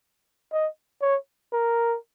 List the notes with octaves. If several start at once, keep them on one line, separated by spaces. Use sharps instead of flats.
D#5
C#5
A#4